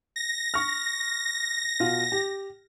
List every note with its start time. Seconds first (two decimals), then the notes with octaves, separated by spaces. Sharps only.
0.16 A#6
0.54 C#6 F6
1.80 B2 F4
2.12 G4